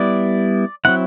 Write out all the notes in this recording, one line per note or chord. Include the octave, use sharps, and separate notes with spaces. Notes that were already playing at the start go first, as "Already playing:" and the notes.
Already playing: G3 B3 E4 D5
F#3 C4 E4 F#5